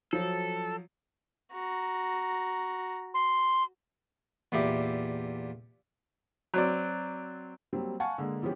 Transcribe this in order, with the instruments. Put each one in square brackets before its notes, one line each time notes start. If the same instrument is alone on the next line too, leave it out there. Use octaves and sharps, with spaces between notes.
[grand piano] F3 F#3 [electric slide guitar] A4
[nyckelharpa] F#4 A#5
[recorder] C6
[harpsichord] E2 A#2 E4 G4
[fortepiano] F#3 C4 D5
[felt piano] F#3 G3 A#3 C4
F5 F#5 G#5 A5 C#6
D3 G#3 A#3
E3 F3 B3 C#4 G4